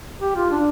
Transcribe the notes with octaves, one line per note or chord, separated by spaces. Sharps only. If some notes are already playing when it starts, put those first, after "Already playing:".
G4
F4
D4